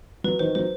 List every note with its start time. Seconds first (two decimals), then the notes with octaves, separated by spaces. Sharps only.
0.24 F#3 B4
0.39 D#3 C5
0.55 F#3 C5